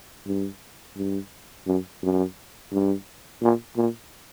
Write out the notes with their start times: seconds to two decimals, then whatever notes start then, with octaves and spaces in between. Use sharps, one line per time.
0.26 G2
0.97 G2
1.66 F#2
2.02 F#2
2.71 G2
3.42 A#2
3.77 A#2